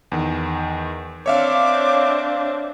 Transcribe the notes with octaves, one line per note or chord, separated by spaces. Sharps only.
E2 D#3
C4 D4 C#5 E5 F5 D6